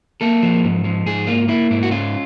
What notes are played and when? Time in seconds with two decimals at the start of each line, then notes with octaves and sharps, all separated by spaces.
0.21 A#3 A4
0.43 F3
0.64 G#2
0.84 F3
1.06 G#2 G#4
1.27 A#3 F4
1.48 A#3 E4
1.71 G#2 E4
1.83 F#4
1.91 C#4 F4